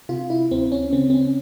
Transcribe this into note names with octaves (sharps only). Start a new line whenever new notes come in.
C3 F4
E4
D2 C4
C#4
C#3 C4
C4
C#4